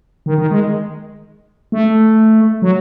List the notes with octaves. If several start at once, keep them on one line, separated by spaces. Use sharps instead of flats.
D#3
D#3
G#3
A3
F#3